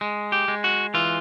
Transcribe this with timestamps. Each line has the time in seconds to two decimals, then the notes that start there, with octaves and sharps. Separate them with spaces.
0.01 G#3
0.32 G4
0.48 G#3
0.64 F#4
0.94 E3 F4